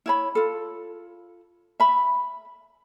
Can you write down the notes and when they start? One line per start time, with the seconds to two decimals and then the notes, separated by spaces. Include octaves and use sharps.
0.06 E4 C#5 B5
0.35 F4 A4
1.80 E5 B5